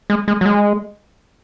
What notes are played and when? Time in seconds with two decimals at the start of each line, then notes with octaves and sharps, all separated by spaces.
0.10 G#3
0.28 G#3
0.41 F#3
0.46 G#3